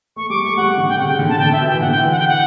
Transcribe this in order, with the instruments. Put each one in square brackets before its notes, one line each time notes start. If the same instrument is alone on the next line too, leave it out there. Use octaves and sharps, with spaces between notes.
[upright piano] A3 [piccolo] C#6
[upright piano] G3 [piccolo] D6
[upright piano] A3 [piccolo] C#6
[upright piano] G3 [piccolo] F#5
[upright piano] D3
[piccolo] G5
[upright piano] C#3 [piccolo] F#5
[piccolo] G5
[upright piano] D3
[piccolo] A5
[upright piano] D3 [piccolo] G5
[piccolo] E5
[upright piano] B2
[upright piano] E3 [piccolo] G5
[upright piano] D3 [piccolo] F#5
[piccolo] G5
[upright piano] E3
[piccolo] F#5
G5
F#5